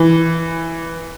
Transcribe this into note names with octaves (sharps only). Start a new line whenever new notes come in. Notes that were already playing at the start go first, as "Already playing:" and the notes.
Already playing: E3